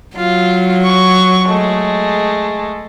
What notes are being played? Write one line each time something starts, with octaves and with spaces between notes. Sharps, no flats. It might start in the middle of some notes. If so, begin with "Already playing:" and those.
F#3 F4
C#6
G#3 A3